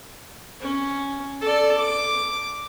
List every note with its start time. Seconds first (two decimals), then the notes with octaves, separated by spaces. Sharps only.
0.61 C#4
1.41 A4 D5
1.77 D6